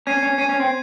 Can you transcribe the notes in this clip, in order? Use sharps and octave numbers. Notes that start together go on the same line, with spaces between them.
C#4 G#6 C7 D#7
C#4
C#4 G#6 C7 D#7
C#4
C4